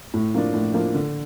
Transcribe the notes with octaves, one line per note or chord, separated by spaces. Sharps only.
A2
F3 A#3 D4
A2
F3 A#3 D4
D3